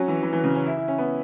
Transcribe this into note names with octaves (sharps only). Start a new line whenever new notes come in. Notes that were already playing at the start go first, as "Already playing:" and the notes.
Already playing: F#3 C#4
E3
E3
E3
C#3
C#4
E4
E4
C#4
B3